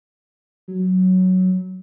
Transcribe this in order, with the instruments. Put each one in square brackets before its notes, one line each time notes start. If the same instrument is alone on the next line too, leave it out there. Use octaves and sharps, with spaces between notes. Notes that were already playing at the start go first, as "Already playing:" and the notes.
[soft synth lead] F#3